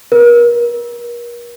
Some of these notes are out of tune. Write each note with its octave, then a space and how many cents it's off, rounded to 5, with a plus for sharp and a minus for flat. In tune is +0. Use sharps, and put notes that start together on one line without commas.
A#4 +40